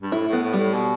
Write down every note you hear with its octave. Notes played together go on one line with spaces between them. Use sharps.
G2
A2 E4
A2
B3
A2
A2 G3
B2